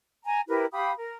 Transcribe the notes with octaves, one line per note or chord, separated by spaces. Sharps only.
G#5 A#5
E4 G4 A#4 B4
G4 F5 B5 D#6
A#4